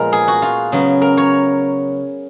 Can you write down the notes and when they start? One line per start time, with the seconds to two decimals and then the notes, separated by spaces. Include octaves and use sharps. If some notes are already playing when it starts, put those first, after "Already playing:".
Already playing: A#2 F3 G#3 B3 A#4
0.13 G#4
0.28 F#4
0.42 F4
0.72 C#3 F#3 B3
1.02 A#4
1.17 C#5